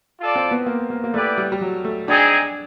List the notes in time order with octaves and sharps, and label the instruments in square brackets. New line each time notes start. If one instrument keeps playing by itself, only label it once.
[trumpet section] F4 A4 D5
[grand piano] C4
B3
A#3
A#3
A#3
[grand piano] A3 [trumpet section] B3 E4 G4 B4 D5
[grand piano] G3
G3
F#3
A3
[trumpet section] C4 D#4 G#4 [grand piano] D4